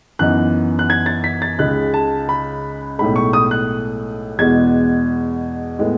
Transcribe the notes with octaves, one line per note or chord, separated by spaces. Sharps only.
F#2 E3 B3 D#4 F#6
F#6
G#6
A6
B6
A6
C#2 C#3 G#3 D#4 F#6
A5
B5
B1 A2 G#3 B5
C#6
D#6
F#6
E2 B2 G#3 G#6
A2 G#3 B3